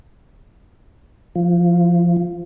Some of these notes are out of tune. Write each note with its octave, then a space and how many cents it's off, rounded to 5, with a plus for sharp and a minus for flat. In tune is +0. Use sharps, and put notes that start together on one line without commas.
F3 -10